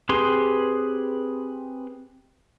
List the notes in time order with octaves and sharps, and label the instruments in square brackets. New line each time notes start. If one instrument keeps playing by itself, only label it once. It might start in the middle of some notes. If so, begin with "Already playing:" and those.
[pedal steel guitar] C4 G4 G#4 B4 C6